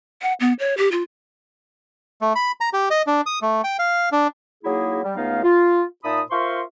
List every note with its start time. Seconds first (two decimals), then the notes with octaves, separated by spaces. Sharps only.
0.22 F#5
0.40 B3
0.60 C#5
0.78 G4
0.92 F4
2.21 A3
2.36 B5
2.61 A#5
2.73 G4
2.90 D#5
3.07 D4
3.26 D#6
3.42 A3
3.64 G5
3.79 F5
4.12 D4
4.64 F#3 A#3 D#4 E4 G#4
5.04 G3
5.17 C#2 A3 B3 D#4 F5
5.43 F4
6.04 A#2 D#4 E5 A5 B5 D#6
6.31 F4 A#4 C5 E5 C6 C#6